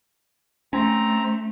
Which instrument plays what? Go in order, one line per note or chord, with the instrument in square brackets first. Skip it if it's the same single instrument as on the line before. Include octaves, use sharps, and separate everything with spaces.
[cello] A3 [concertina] C4 A#5 [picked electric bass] C#4